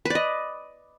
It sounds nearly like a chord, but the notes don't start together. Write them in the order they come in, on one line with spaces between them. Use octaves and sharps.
B4 D5 D#5